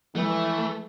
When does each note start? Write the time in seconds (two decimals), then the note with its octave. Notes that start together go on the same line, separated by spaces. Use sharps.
0.16 E3 F3 G#3 A3